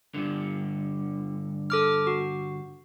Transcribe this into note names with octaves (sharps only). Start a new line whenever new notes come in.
G2 D3
A4 D6 F6
F#4